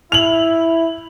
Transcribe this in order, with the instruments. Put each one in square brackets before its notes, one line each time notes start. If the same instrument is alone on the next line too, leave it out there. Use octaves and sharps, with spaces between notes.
[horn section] E4 [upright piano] F7 F#7